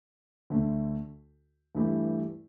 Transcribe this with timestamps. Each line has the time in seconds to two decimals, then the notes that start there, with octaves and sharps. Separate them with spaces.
0.50 D2 D3 A3
1.75 G2 E3 A3 E4 G4